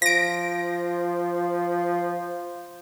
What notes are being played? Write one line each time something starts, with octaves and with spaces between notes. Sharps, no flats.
F3 A#6 D7